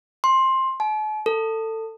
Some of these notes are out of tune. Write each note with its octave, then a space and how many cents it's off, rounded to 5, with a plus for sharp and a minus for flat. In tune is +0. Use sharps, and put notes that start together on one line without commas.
C6 +15
A5 -45
A4 +20